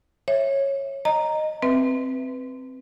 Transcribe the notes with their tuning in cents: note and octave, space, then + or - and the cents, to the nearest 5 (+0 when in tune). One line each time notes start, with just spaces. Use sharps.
C#5 -15 E5 +0
D#5 -10 A#5 +0
C4 +0 B4 +0 E5 +0